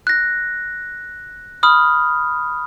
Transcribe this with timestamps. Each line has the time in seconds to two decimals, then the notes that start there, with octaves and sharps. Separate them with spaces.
0.07 F#6 A#6
1.63 B5 D#6 F6